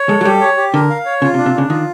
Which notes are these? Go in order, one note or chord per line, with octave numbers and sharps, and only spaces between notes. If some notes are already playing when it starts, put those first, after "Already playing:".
Already playing: C#5
G#3 A4
F#3
G3 G4
C#5
G4
D3 A#4
F5
C#5
C#3 F4
C3
D4
C3
C#3 D4
D#3 F4